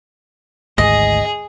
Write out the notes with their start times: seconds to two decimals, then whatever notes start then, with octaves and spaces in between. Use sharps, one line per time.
0.78 G#1 D2 G#2 G#4 D#5